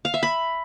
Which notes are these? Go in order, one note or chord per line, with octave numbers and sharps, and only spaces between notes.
F5
E5
B5